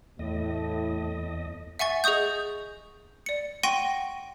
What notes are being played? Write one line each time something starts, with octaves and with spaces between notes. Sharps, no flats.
E2 A2 D#5
E5 F#5 G#5 C#6 A6
G#4 D#5 C#6 D#6 G6
D5 C#7
F#5 G5 C6 C#6 A#6 D#7